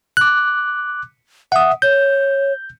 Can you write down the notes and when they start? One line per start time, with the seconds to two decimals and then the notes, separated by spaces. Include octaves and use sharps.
0.17 D6 F#6
1.52 E5 F#5 D#6
1.82 C#5 G6